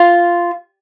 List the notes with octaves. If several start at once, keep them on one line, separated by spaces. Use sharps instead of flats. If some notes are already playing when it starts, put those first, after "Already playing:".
Already playing: F4